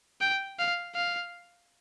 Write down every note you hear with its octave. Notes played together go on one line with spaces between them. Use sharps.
G5
F5
F5